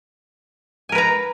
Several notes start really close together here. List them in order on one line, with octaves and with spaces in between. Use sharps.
G#5 A#4 B4 A#5